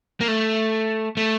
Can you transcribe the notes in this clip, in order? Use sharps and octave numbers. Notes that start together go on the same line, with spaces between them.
A#3
A3
A3